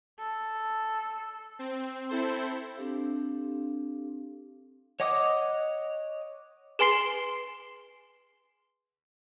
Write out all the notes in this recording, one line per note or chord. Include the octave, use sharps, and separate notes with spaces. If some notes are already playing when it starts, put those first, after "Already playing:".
A4
C4
C4 E4 A4 C5
C4 D4 G4 A4 F5
C#5 D#5 F#5 D6 D#6
G#4 B4 G#5 C6 C7 G7